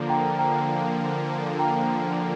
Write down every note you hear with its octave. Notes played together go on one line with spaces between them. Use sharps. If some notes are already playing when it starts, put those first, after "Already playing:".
Already playing: D3 F3 A#3
G5 A#5
G5 A#5
G5 A#5